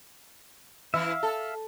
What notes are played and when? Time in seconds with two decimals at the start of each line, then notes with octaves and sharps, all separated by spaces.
0.94 E3 E4 E5 F5
1.23 A4